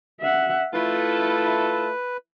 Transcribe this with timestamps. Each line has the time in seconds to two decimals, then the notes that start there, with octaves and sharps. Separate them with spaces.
0.21 E5 F#5
0.74 A3 E4 F4 A4 B4